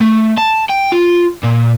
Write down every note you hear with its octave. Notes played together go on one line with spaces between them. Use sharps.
A3
A5
G5
F4
A#2